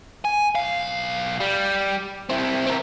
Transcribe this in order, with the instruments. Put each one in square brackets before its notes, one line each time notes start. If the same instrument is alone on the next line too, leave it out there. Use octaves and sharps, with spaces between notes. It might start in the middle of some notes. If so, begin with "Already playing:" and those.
[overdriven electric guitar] G#5
B1 F5
G3
C4 E4
C4 A#4